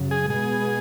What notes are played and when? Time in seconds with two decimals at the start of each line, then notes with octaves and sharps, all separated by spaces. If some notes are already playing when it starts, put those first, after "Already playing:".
Already playing: F#2 C#3 F#3
0.11 G#4
0.30 B2 G#3 B3 G#4